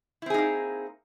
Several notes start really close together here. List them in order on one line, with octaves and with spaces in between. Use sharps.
E4 C4 G#4 D#4 A#3